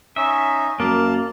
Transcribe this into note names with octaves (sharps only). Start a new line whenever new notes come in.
C#4 D#4 E5
F#2 A#3 A5